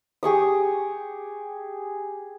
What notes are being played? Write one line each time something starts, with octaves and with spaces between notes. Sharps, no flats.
G4 G#4 C#6 D#6